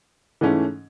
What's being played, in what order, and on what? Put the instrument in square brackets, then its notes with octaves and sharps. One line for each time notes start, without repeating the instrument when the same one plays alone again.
[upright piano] G#2 E3 A3 C#4